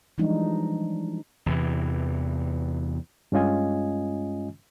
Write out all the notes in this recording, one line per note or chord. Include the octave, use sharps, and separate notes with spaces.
E3 F3 G3 G#3 D4 D#4
E2 C3 E3
G2 G#3 C#4 F4 D#5 G#5